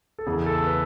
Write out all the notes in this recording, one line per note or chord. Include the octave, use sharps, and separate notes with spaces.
A4
E2 C#3 E3 G#4
A4
B4